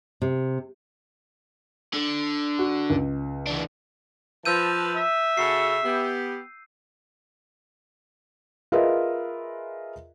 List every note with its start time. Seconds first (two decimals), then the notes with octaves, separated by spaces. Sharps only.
0.22 C3
1.94 D3
2.59 F#4
2.90 C#2
3.47 E3 D4
4.45 F3 B4 A5 E6 G6 D#7
4.95 E5
5.37 C#3 F#4 A4 C7
5.85 B3 G4
8.72 F4 G#4 A#4 B4 D#5 E5